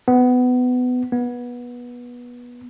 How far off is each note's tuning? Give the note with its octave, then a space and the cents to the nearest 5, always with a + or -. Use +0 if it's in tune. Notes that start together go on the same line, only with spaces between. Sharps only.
B3 +20
B3 -20